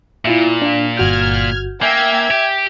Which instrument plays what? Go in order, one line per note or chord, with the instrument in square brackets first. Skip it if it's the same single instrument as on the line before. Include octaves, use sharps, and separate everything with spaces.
[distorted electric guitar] A#2 [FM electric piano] E4 F4 E5
[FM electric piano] D4 F5
[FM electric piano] G1 F#4 G6 [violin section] F6 G#6
[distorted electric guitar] A#3 [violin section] E5 G5 G#6 [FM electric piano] G#5 G6
[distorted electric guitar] G4